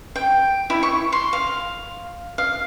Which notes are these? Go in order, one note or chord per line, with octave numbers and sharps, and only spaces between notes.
G5
E4
C#6
C6
F5
F5